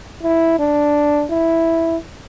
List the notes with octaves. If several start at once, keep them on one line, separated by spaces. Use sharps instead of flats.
E4
D4
E4